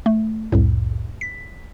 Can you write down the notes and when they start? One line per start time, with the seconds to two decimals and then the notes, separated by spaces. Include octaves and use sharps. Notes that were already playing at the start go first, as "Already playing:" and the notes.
0.06 A3
0.52 C2 F2 A2
1.21 B6